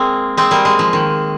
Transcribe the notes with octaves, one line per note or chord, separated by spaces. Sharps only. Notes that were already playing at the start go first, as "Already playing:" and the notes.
Already playing: G#3 A#3 C4
G#3 C4
G3 A#3
G#3
F3
D#3